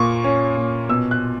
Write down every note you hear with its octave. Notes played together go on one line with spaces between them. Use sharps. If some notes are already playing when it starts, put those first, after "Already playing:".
Already playing: A#2 A#3 C#6
C#4
A#2
B2 E6
F#6